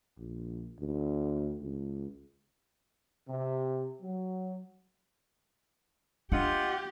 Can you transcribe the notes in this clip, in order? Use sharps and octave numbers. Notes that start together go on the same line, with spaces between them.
A#1
D2
C#2
C3
F#3
D4 F4 G4 D#5 F#5